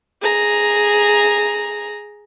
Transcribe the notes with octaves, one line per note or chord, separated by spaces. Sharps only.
G#4 A#5